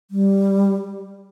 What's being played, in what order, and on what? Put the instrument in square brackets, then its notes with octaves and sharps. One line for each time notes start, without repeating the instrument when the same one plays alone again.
[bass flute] G3